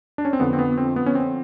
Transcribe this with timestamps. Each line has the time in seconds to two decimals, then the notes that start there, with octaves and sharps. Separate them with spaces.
0.18 D4
0.25 C#4
0.33 C4
0.40 F2 D3 F3 B3
0.53 C4
0.59 B3
0.78 C4
0.96 B3
1.06 C#4
1.15 C4